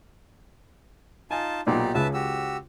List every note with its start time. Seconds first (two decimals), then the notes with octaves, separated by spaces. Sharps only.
1.31 D#4 F4 G#5 A5
1.67 B1 A#2 D#4 G4 D5
1.95 C#2 C#3 B4 E5 A5
2.14 F#4 G4 E6